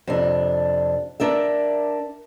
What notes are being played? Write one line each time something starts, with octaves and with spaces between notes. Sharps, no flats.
F2 C3 D4
D4 A#4 E5